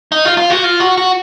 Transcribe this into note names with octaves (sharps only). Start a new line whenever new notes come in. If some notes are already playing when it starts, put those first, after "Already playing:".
D#4
F4
F4
F#4
F4
F#4
F#4